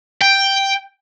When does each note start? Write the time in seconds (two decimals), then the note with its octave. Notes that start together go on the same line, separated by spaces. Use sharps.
0.21 G5